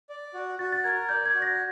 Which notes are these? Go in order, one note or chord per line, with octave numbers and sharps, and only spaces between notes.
D5
F#4
F#4 A6
A6
A#4 G#6
D5 G6
G#6
F#4
A#6